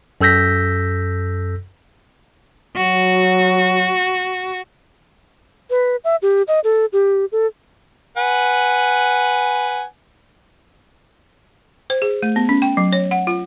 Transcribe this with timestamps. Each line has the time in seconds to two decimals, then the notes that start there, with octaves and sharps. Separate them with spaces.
0.21 F#2 A4 E6 G6 A#6 B6
2.77 F#3 F#4
5.70 B4
6.04 E5
6.22 G4
6.48 D#5
6.64 A4
6.93 G4
7.32 A4
8.17 B4 F#5 G#5
11.90 C5
12.02 G#4
12.23 A3
12.36 B3
12.49 C#4
12.62 G5
12.77 F#3
12.93 C#5
13.11 F#5
13.27 F4